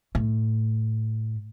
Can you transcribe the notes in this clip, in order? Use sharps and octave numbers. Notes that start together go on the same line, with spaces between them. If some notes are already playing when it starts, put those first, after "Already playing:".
A2